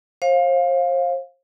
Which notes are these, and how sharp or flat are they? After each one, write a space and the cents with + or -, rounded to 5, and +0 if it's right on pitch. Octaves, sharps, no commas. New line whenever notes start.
C5 +40 F5 +5